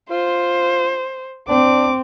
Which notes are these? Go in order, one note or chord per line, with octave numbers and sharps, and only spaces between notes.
F4 C5
C4 D4 D6